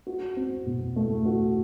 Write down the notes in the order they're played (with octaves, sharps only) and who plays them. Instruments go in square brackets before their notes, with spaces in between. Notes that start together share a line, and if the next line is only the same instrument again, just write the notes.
[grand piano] F#4
C4
B2
A3
F#4